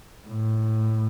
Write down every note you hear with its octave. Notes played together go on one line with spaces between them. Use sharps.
A2